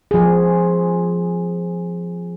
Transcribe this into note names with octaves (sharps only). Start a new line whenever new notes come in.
F3 G#4